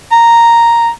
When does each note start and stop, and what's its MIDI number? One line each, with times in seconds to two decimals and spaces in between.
0.12 0.90 82